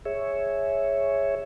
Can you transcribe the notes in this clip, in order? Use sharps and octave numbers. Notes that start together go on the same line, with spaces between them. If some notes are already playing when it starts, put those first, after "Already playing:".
G#4 C#5 E5